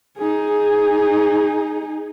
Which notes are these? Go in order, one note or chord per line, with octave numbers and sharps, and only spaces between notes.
D#4 G#4